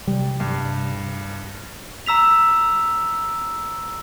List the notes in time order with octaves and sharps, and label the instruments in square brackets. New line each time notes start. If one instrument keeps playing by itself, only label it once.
[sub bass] C3 [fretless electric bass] G3
[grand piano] G2
[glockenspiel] A#5 E6 B6 F7